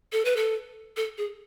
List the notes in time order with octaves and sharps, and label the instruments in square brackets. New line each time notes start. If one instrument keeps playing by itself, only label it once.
[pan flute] A4
B4
A4
A4
G#4